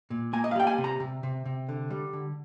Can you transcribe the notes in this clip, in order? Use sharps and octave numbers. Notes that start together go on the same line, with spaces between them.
A#2
A#3 G#5
D#5
F5
G3 G5
G#5
C3
A#5
C3
C3
C3
D3
G3
D3